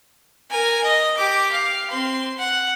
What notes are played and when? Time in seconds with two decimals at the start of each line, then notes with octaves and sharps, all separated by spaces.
0.51 A#4 G#5
0.84 D#5
1.17 G4 D6
1.52 F5
1.91 C4 C6
2.38 F#5